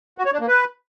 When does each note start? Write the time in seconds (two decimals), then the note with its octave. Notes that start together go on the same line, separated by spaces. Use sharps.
0.18 F#4
0.26 C#5
0.33 D4
0.40 A#3
0.48 B4